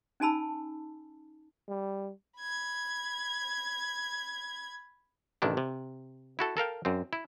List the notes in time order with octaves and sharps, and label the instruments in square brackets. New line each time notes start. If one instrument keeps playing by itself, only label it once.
[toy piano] C#4 D#4 G#5 A5 B5 E6
[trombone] G3
[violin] B5 G#6
[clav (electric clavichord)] A1 C3 D#3 D4 E4
C3
E4 F#4 A4
A4 A#4 F5 G5
F#2 C4
E4